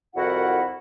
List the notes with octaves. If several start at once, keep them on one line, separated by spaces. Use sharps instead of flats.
C2 F2 E4 F#4 A#4 F#5